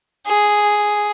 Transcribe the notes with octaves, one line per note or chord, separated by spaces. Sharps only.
G#4